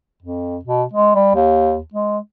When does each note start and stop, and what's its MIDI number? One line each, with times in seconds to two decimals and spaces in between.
0.23 0.58 41
0.65 0.83 47
0.93 1.13 56
1.15 1.33 55
1.35 1.80 39
1.94 2.18 56